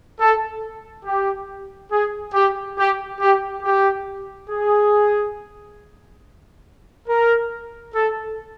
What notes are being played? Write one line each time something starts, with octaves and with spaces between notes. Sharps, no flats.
A4
G4
G#4
G4
G4
G4
G4
G#4
A#4
A4